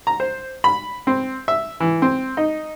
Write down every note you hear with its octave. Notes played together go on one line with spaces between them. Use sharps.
A#5
C5
B5
C4
E5
E3
C4
D#4